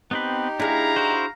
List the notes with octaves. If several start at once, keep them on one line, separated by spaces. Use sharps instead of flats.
B3 C4 D#4 G4 B4
D4 E4 G#4 F5 A#5
E4 F#4 C5